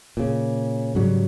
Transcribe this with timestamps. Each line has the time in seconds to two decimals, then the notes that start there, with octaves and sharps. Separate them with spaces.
0.17 A#2 C#3
0.95 G#2 C#3 F#3 G3